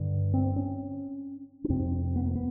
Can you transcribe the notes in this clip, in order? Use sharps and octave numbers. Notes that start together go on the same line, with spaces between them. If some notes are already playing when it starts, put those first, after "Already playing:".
Already playing: G2 D3
C4
C#4
C#4
F2 C3 C4
B3
A#3
B3